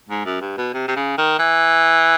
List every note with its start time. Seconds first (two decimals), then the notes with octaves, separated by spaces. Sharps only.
0.09 G#2
0.25 F#2
0.41 G2
0.58 B2
0.74 C3
0.88 C3
0.96 C#3
1.18 D#3
1.39 E3